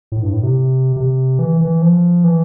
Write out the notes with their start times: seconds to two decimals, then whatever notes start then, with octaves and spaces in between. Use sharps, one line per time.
0.12 A2
0.22 G2
0.33 A2
0.43 C3
0.96 C3
1.39 E3
1.61 E3
1.82 F3
2.24 E3